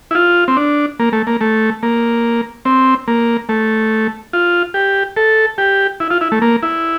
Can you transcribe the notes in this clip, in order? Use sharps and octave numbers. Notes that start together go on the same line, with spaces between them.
E4
F4
C4
D4
A#3
A3
A#3
A3
A#3
C4
A#3
A3
F4
G4
A4
G4
E4
F4
E4
A3
A#3
E4